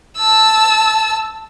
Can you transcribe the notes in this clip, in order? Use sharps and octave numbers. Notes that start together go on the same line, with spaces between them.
A5 E6